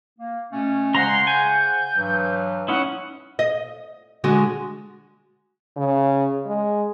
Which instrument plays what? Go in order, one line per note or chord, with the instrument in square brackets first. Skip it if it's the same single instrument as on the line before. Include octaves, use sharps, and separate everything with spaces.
[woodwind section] A#3
B2 A3 C#4
[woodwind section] C#3 C5 F#5 [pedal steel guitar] G#3 A#5 [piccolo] C6
[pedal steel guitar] G#5 [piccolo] G6
[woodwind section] G2 E3 F#3
[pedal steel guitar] C#4 D#4 E4 [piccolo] F#5
[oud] D#5
D3 G#3 F#4
[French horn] C#3
G#3